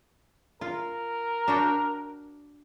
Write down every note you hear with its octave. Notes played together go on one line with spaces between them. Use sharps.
F4 A#4
D4 F#4 G5